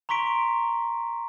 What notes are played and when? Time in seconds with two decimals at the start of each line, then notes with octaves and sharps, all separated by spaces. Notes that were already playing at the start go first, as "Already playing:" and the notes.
0.09 A#5 C6 C#6 B6 D7